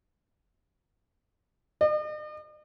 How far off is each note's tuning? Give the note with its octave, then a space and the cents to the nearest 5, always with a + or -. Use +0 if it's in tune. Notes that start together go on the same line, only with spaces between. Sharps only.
D#5 -45